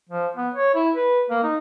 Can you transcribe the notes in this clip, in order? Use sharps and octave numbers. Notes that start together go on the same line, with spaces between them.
F3
B3
C#5
E4
B4
A#3
D#4